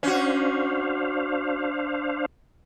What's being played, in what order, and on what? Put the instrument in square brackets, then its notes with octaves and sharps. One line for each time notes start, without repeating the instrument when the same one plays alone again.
[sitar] C#4 F#4 [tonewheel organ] D4 C5 F5